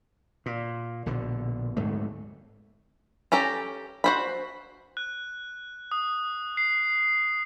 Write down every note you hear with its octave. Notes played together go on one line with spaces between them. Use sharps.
A#2
A#1 B2 D3
D1 G#2 A3
C#4 G4 A4 A#5
F#4 C5 B5
F#6
D#6
C7